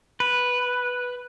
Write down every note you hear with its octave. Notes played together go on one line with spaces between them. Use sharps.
B4